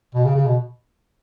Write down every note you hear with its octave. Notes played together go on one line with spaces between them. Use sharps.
B2
C#3
C#3
B2